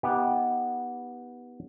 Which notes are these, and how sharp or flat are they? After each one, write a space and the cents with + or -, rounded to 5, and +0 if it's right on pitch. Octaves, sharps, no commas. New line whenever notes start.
B3 -10 D#4 +25 G4 -5